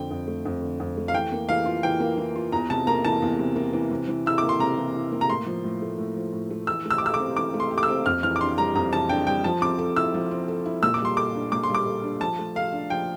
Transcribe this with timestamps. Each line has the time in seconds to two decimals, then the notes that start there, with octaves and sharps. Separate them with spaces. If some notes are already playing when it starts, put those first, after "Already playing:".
Already playing: F2 D3 G5
0.11 F2
0.27 A3
0.45 F2
0.62 D3
0.80 F2
0.97 A3
1.08 F5
1.13 E3 G5
1.32 A#3
1.49 E3 F5
1.66 F4
1.83 E3 G5
2.00 A#3
2.18 E3
2.36 F4
2.52 E2 A#5
2.70 C3 A5
2.87 A#3 A#5
3.05 E3 A5
3.22 E2
3.39 C3
3.56 A#3
3.73 E3
3.91 C3
4.08 E3
4.26 E4 E6
4.38 A#3 D6
4.49 C6
4.59 C3 A#5
4.78 E3
4.95 E4
5.12 A#3
5.21 A#5
5.29 A2 C6
5.46 F3
5.64 A2
5.82 A3
5.98 A2
6.15 F3
6.33 A2
6.50 A3
6.67 E3 E6
6.85 A3
6.91 E6
6.98 D6
7.02 G4 E6
7.14 D6
7.19 C4
7.37 E3 D6
7.54 A3
7.60 C6
7.71 G4
7.78 D6
7.83 E6
7.88 C4
8.06 F2 F6
8.23 E3 F6
8.36 D6
8.41 D4 C6
8.57 G3 A#5
8.75 F2 A#5
8.93 E3 A5
9.09 D4 G5
9.27 G3 G5
9.44 F3 A5
9.61 C4 D6
9.79 A4
9.96 E4 E6
10.14 F3
10.31 C4
10.48 A4
10.66 E4
10.83 A#2 E6
10.94 D6
11.00 G3 C6
11.17 A4 D6
11.35 D4
11.52 A#2 D6
11.63 C6
11.69 G3
11.75 D6
11.87 A4
12.03 D4
12.21 F3 A5
12.39 A3
12.55 A4 F5
12.73 D4
12.90 F3 G5